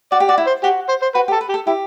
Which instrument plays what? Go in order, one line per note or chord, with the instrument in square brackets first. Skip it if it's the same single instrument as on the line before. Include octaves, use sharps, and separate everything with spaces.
[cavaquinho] F#4 [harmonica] D5
[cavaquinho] G4
[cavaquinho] F#4 [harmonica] D5
[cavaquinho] E4
[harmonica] C5
[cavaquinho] F#4 [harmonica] G4
[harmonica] C5
C5
[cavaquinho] F#4 [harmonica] B4
[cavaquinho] G4
[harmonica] A4
[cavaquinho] B4
[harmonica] G4
[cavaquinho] A4
[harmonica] E4 [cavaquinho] G4